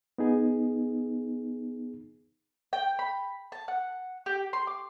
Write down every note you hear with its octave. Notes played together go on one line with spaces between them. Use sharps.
B3 D#4 G#4
G5
B5
A5
F#5
G4
C6
D6